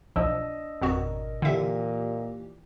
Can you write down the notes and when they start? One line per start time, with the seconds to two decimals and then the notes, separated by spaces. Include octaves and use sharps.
0.16 B1 F3 D4 D#5 E6
0.82 G#1 F2 B2 B3 F#4 A#4
1.42 A#2 D3 E3 G4 E5